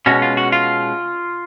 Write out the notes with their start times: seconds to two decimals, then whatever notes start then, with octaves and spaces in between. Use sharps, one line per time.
0.06 B2 G#3 C#4 F#4
0.22 F4
0.37 F#4
0.52 F4